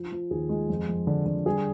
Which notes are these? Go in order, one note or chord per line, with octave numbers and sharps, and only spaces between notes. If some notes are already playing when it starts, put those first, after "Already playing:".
Already playing: F3
F3
D#2 G#4
G#3
F2
F2
D3
D3
G3 G#4